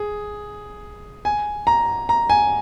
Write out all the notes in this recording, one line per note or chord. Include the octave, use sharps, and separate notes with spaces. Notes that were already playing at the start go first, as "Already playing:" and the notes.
Already playing: G#4
G#5
A#5
A#5
G#5